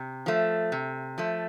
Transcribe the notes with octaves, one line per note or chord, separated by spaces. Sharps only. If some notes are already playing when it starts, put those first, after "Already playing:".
Already playing: C3
F3 A3
C3
F3 A3